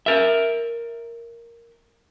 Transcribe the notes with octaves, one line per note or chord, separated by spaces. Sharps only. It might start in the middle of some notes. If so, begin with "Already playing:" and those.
A#4 E5